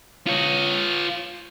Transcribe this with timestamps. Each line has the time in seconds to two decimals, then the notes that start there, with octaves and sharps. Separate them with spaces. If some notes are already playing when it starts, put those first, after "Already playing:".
0.27 F4 C#5